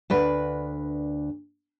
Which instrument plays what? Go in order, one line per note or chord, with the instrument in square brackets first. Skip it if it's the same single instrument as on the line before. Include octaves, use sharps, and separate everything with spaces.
[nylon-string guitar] D2 D4 B4